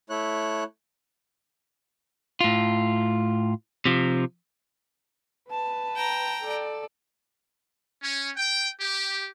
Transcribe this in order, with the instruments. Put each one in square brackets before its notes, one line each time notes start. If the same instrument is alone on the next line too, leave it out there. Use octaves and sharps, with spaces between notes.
[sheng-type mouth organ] A3 E4 C#5 F#6
[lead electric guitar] A2 F4
C3 F3
[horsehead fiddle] B4 A5
[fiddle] G5 A#5
[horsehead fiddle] A4 D5
[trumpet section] C#4
G5
G4